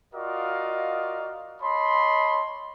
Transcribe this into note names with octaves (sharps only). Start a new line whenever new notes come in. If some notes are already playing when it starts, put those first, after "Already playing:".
F4 F#4 A#4 D5 D#5 F5
C#5 D#5 A5 B5 C6